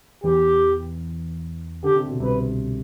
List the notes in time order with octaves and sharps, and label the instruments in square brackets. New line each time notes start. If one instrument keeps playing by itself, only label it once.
[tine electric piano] E2 E3 [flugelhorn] G4
[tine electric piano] D3 [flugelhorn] G4
[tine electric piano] C3
B2
[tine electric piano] C2 C3 [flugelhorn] B4